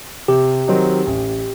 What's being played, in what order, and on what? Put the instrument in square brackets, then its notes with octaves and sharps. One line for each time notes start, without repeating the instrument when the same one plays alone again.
[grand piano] C3 [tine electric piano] G4
[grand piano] D#3 F#3 C4 D#4
A1